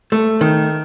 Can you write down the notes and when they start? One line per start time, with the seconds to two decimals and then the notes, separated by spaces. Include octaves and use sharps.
0.12 A3
0.41 D#3